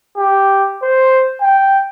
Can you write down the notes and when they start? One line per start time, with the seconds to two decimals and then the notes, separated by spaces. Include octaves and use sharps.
0.17 G4
0.83 C5
1.41 G5